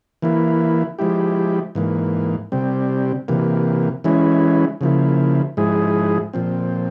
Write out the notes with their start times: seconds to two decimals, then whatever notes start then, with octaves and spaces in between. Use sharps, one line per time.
0.22 E3 A#3 E4
0.99 F3 G#3 E4 G4
1.75 G#2 E3 A#3
2.52 C3 G3 C4
3.28 C3 E3 A#3
4.04 E3 G#3 C#4 E4
4.81 C#3 F3 A#3 E4
5.57 G#2 F3 G#3 E4 G#4
6.33 A#2 F3 C4